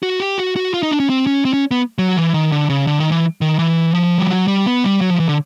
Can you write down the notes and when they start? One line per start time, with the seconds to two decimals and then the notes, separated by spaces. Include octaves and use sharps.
0.03 F#4
0.20 G4
0.38 F#4
0.56 F#4
0.74 F4
0.83 D#4
0.91 D4
1.00 C#4
1.10 C4
1.27 C#4
1.45 C4
1.53 C#4
1.71 B3
1.98 F#3
2.17 E3
2.34 D#3
2.52 D3
2.70 C#3
2.87 D3
3.00 D#3
3.12 E3
3.41 D#3
3.59 E3
3.95 F3
4.18 G3
4.30 F#3
4.48 G3
4.66 B3
4.84 G3
5.01 F#3
5.10 F3
5.20 E3
5.29 D3